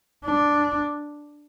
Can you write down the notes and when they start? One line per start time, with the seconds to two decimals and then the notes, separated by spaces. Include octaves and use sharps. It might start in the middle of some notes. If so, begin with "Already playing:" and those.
0.25 D4